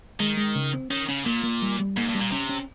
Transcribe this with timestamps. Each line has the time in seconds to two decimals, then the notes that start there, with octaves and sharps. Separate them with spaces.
0.20 D#3 G#3
0.37 G#3
0.55 C#3
0.73 C4
0.90 D#3 C#4
1.09 C#3 C#4
1.25 A#2 A#3
1.44 A#3
1.62 G3
1.80 G3
1.97 G#2 A#3
2.09 G2
2.15 G3
2.21 A#2
2.32 C3 C#4
2.49 C#4